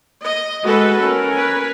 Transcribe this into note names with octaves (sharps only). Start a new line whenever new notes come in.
D#5
G#3 F#4 A4 B4
C#4 A#4
B4 G#5